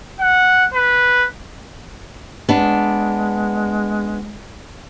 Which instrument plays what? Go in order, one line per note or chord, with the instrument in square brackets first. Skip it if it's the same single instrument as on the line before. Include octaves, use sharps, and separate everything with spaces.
[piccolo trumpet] F#5
B4
[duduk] G#3 [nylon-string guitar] B3 D4